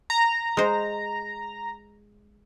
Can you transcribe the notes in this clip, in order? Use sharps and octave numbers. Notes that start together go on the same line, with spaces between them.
A#5
G#3 C5